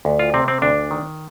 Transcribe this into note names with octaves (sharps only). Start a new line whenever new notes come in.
D2
F4
C3 C4
C4
D2 D4
D#3